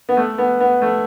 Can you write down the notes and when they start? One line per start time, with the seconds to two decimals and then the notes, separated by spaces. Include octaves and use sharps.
0.09 B3
0.17 A3
0.38 B3
0.60 B3
0.82 A3